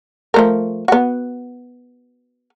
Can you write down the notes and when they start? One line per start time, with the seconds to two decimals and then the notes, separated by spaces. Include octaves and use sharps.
0.34 F3 A3 A#4
0.88 B3 F#4